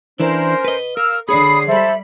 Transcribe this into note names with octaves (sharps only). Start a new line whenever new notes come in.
E3 C#4 D4 E4 A#4 C5
B4 D#5
A#4 F5 E6 F6
D3 G#4 C#5 D5 B5 D#6 C7
G3 A4 C5 E5 B5